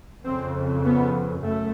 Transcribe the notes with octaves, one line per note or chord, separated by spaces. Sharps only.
F2 C#3 C4
B3
F#2 A3